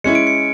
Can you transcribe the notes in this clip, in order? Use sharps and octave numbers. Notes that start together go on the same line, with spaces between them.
G#3 C#4 E4 C#7
D7
C#7